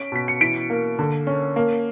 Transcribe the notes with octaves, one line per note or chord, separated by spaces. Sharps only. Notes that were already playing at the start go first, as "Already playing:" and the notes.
Already playing: C#4 B6 D7
B2 B6
C#7
E3 B6 D7
A#3
D3
C#4
A#3